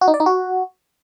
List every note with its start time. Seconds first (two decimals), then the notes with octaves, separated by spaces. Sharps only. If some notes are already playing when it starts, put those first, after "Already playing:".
0.01 F#4
0.08 D#4
0.14 D5
0.20 D#4
0.26 F#4